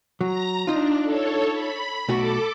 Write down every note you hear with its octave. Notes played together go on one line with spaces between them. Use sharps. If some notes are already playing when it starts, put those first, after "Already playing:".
F#3 A#5 A#6
D4 D#4 F4
A4 C#5
B5
B1 A3 F#4 A4 D6